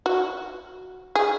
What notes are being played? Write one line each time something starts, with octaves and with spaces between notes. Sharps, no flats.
F#4
G#4